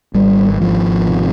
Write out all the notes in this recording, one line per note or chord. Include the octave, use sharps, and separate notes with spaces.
G#1 G3
G#1 F3
C3